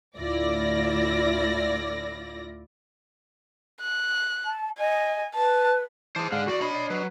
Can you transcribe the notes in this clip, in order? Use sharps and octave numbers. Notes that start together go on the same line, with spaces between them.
D2 A2 E4 F4 D5 A#6
F#6
A5
D#5 G#5
B4 A5
E3 G#4 C5 A5 D6
G#2 D3 G#3 F5 F#5
E2 F#4 D5
D4 C#5 D#5 B5
D5
F#3 B4